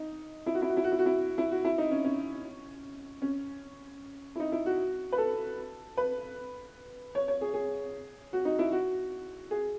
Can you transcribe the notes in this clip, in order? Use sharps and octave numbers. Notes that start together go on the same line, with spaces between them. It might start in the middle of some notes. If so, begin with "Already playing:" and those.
Already playing: D#4
E4
F#4
E4
F#4
E4
F#4
E4
F#4
E4
E4
F#4
E4
D#4
C#4
C#4
C#4
E4
D#4
E4
F#4
B4
A4
B4
C#5
C#5
G#4
G#4
F#4
D#4
E4
F#4
G#4